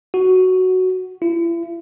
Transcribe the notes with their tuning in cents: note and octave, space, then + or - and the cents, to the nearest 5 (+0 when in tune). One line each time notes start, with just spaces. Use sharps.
F#4 +5
E4 +40